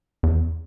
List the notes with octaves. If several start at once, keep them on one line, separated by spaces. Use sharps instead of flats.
E2